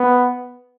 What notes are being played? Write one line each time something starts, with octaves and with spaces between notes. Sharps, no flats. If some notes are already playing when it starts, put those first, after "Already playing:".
Already playing: B3